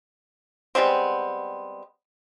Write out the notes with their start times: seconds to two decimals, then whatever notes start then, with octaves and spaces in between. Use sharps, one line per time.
0.75 G3 G#3 B3 C4